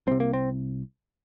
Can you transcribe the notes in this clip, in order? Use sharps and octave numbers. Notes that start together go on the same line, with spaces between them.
C2 C3 C4
A#3
C4